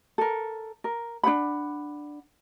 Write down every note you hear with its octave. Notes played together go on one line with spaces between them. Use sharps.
A4 A#4
A#4
D4 C5 F#5 B5